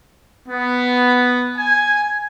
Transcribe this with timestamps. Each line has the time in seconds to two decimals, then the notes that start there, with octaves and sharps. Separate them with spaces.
0.48 B3
1.58 G#5